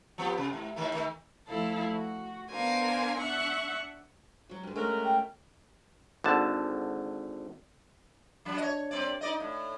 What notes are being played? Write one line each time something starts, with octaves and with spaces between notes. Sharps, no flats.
F3 B3 G4
C3
G#2
A2 D#3 A3
D#3 A3
D2 F3 E4 A4 F5
F#4
B3 D4 A#4 C5 F5 G#5
D4 E5 F#5 C#6 F#6
F#3 F#4
G2 D3
G#3 A3 C#4 F#4 A#4
G5
G#1 D3 A5
F#3 D4
C#5 D#5
G2 C4 D5
D#4 D5 D#5
A2